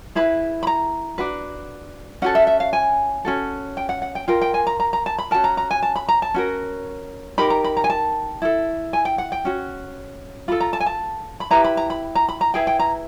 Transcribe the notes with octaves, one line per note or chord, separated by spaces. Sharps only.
E4 G#4 B4 B5
B5
A#5
D4 F#4 B4
C#4 F#4 A4 F#5
E5
E5
F5
G#5
C#4 F#4 A4
G5
F#5
F#5
G5
F4 A#4 G5
G5
G#5
A#5
A#5
A#5
A5
B5
C#4 F#4 A#4 A5
A#5
A#5
G#5
A5
B5
A#5
A5
C#4 F#4 A#4
D#4 G4 A#4 B5
A#5
B5
A#5
G#5
A5
E4 A4
G#5
G5
F#5
G5
C#4 F#4
F4 A4 B5
A#5
A5
G#5
A5
B5
E4 G4 B4 A#5
B5
A#5
B5
A#5
B5
A#5
E4 G#4 B4 G5
G5
A#5